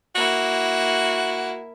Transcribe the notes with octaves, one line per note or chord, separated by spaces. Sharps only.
A#3 E4 F#4